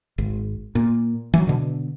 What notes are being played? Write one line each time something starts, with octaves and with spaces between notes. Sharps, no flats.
G#1
A#2
E3 F#3
B2 D3